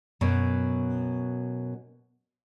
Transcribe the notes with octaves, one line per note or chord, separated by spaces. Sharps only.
F#2 B2 F#3